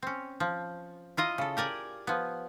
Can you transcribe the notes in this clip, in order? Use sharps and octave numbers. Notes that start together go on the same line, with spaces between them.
C4 C#4
F3
E4 F4 D#5 A#5
C#3 A4
G4 A#4 D5 G#5
F3 B3